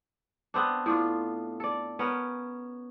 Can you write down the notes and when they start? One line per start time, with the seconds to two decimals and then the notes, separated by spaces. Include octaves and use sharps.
0.54 B3 C4 D4
0.86 A2 D4 F4
1.60 A4 D5
1.99 B3 C#4 A#4